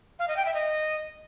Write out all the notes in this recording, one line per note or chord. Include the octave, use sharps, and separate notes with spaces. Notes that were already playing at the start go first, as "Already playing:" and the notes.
F5
D#5
G5
E5
D#5